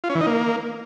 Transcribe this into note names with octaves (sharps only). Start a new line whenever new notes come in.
F4
C#4
E3
D#4
A#3